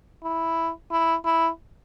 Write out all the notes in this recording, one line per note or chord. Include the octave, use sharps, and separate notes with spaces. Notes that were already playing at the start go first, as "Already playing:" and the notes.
E4
E4
E4